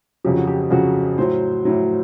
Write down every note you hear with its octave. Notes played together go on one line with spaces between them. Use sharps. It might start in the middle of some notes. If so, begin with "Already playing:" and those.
F2 C#3 F#3 G4
F#4
G4
F2 C#3 F#3 F#4
A2 F#3 C5
A2 F#3